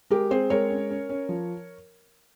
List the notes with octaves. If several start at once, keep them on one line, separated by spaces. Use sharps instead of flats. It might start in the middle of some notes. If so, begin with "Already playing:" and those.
G#3 G4 A#4
C4 G#4 C5
G#3 A#4 C#5
C#4
C#4
C#4
F3